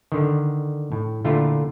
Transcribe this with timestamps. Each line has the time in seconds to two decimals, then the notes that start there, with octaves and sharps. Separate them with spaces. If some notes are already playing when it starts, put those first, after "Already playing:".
0.12 D3 D#3
0.92 A2
1.25 A#2 D3 A3 E4 F4